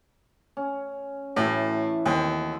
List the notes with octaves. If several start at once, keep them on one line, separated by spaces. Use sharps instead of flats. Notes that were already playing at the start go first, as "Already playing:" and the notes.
C#4
A2 E3 A3 F#4
D#2 C4